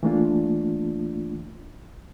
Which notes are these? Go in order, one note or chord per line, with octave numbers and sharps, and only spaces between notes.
E3 A3 A#3 D4 F4